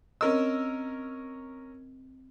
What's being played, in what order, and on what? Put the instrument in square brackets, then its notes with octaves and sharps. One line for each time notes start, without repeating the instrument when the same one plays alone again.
[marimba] C4 D#5 [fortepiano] C#4 A#4 E6